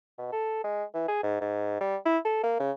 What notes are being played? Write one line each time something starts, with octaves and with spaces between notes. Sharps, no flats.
B2
A4
G#3
E3
G#4
G#2
G#2
G3
E4
A4
A#3
C#3